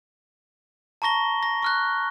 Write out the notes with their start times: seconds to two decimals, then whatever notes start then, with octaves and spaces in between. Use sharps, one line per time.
1.02 A5 A#5 C#6 A#6 G7
1.43 A#6
1.62 C#6 F6 F#6